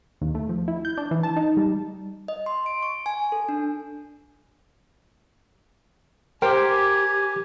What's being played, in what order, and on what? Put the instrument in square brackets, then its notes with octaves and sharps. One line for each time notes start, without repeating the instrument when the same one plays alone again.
[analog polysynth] D#2
A3
F3
E4
G6
D4
E3
A5
D#4
G3
[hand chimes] D#5
C6
D7
C#6
G#5
A4
D4
[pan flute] G4 [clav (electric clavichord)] A#4 [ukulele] C5 G5 [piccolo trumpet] G#5